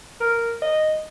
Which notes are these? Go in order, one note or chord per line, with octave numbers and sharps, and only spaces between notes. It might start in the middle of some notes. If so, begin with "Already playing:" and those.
A#4
D#5